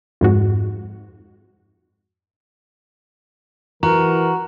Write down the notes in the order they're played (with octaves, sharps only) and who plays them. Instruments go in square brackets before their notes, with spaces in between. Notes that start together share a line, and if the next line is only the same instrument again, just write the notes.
[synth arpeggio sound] F2 G#2 F#4
[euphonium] E3 [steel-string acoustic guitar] F#4 [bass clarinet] A#4 [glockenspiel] A#5